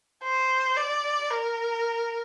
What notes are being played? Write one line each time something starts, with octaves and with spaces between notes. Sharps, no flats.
C5
D5
A#4